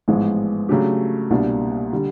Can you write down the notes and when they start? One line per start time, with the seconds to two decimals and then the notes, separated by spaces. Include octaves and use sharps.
0.08 A1 G#2 F3 G#3 B3
0.69 C#3 F#3 A3 D4 G4
1.30 C2 B2 G3 A#3 D4
1.92 D3 G3